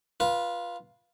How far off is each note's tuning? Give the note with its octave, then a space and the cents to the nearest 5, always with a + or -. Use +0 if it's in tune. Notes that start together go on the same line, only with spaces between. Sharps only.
F4 +0 B4 -25